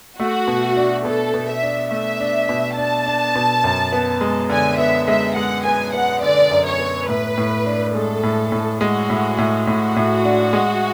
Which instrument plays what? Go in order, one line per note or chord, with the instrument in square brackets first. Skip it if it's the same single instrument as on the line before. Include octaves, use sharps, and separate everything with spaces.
[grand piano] A3 [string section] F#4
[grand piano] B2
D4
[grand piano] B2 [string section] A4
[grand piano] B2
[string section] E5
[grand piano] D4
[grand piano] A3 [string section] E5
[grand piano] D4
B2
[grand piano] D4 [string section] A5
[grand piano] D4
B2
F#2
B3
G#3
[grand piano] D3 [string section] G#5
[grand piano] B3 [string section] E5
[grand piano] G#3 [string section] E5
[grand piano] G#3 [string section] F#5
[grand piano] B3 [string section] G#5
[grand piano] B3 [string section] F#5
[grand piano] D3 [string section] D5
[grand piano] F#2
[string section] C#5
[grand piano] B3
[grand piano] A2 [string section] B4
[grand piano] A2
D4
[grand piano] G#3 [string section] A4
[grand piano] A2
A2
[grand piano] G#3 [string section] F#4
[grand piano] A2
A2
[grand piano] A2 [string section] F#4
[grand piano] A2
D4
G#3